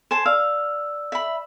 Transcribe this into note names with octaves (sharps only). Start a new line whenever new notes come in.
C5 G#5 A5 E7
D5 F5 E6
E5 B5